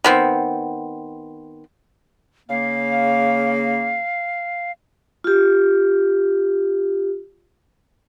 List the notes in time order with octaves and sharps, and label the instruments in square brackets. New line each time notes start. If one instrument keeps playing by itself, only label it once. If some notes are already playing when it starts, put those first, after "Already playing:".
[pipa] D#3 B3 C4
[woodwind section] C#3 A#3 [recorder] F5
[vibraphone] F4 G4